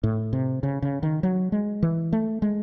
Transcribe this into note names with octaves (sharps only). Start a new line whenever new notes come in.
A2
C3
C#3
C#3
D#3
F#3
G#3
E3
A3
G#3